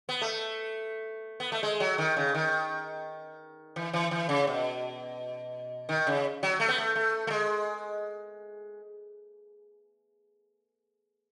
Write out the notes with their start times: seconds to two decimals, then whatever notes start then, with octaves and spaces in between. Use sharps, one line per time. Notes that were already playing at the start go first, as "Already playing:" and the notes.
0.09 B3
0.22 A3
1.40 B3
1.52 A3
1.63 G#3
1.80 F#3
1.98 D#3
2.17 C#3
2.35 D#3
3.76 E3
3.93 E3
4.11 E3
4.29 C#3
4.47 B2
5.89 D#3
6.07 C#3
6.43 F#3
6.60 A3
6.68 B3
6.78 A3
6.96 A3
7.27 A3
7.31 G#3